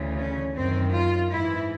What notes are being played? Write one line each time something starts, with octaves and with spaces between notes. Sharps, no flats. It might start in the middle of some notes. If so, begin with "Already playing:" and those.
Already playing: D2 C#3 E3
C#4
F#2 D#3 C4
F4
G#2 E3 E4